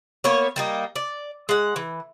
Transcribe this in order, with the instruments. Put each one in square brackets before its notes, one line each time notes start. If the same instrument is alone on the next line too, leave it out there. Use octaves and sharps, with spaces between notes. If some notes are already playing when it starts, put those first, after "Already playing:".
[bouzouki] A#3 B3 C#5
G3 A#3 D#4
D5
G#3 F#5
E3